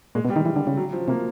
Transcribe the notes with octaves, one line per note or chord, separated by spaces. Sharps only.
A#2 G#3
B2
G3
D#3
E3
D3
C#3
F#3
F3
C3 A#3